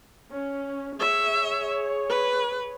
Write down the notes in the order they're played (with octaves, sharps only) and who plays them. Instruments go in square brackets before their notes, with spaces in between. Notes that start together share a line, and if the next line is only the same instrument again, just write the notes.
[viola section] C#4
[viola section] G#4 C#5 [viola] E5
[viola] B4